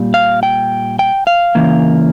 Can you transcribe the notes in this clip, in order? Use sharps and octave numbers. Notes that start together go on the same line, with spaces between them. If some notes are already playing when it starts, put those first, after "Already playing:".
Already playing: A#2 G3
F5
G5
G5
F5
C#3 E3 A#3